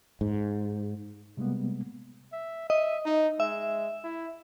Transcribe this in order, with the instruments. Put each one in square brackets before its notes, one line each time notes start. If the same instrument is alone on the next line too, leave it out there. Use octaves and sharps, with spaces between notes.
[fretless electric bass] G#2
[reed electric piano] C3 G3 G#3 A#3 B3
[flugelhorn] E5
[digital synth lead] D#5 [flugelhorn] E5
[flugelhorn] D#4
[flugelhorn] G#3 [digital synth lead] E5
[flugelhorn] E4